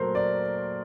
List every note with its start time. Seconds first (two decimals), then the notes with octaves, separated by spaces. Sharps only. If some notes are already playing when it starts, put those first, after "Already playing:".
Already playing: A#2 F#3 A3 A#4 C5
0.15 D5